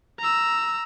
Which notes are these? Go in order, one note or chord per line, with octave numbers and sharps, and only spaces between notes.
A#5 E6